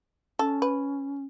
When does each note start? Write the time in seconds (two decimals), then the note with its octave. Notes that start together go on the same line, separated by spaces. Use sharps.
0.39 C#4 A4
0.62 B4